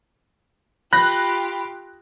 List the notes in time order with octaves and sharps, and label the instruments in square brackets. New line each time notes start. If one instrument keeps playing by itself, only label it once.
[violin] F4 G4 [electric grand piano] B5 [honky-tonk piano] F#6 A#6